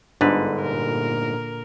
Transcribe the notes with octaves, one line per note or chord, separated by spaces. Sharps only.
G1 G#2 D3 B4
A#2 A#4